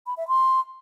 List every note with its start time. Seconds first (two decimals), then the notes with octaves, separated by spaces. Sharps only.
0.07 B5
0.17 E5
0.28 C6